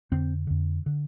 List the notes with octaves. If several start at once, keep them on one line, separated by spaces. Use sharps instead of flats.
F2 D3 C4
F2 D3
D3